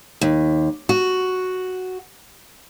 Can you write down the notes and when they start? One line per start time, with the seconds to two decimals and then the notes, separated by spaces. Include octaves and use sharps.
0.21 D#2
0.89 F#4